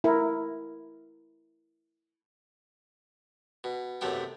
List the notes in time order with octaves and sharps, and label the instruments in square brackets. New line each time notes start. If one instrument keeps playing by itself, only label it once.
[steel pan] E4 A#4
[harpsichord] B2
B1 F#2 C3 A3 B3 G5